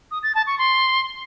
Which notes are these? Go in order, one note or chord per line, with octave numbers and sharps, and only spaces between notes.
D#6
A6
A5
C#6
C6